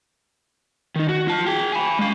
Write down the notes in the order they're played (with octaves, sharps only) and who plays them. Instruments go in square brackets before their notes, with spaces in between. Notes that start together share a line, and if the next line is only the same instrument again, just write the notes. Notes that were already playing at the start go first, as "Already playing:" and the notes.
[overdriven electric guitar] D#3 D#4
F#4
F4 A5
G#4 G5
G#5 B5
G#3 F5